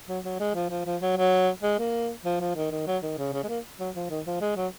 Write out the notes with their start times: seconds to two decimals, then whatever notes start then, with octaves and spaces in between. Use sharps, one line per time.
0.09 F#3
0.24 F#3
0.40 G#3
0.54 F3
0.70 F3
0.86 F3
1.01 F#3
1.17 F#3
1.63 G#3
1.79 A#3
2.25 F3
2.41 F3
2.56 D#3
2.71 D#3
2.87 F#3
3.03 D#3
3.18 C#3
3.33 C#3
3.43 G#3
3.48 A#3
3.79 F#3
3.95 F3
4.10 D#3
4.26 F3
4.41 G#3
4.56 F#3